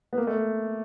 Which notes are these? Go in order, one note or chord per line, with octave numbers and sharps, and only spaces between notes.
B3
A#3
A3